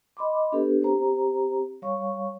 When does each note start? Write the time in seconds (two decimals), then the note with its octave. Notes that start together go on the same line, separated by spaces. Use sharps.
0.17 D#5 B5 C6 D6
0.52 B3 D4 G4 A4 B4
0.82 C4 G4 C5 A#5
1.82 G3 C#5 F5 C#6